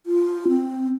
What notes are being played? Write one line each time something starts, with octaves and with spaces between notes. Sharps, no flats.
F4
C4